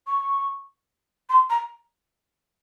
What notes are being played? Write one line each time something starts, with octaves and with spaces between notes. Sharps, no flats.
C#6
C6
A#5